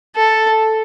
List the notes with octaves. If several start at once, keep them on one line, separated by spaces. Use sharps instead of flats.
A4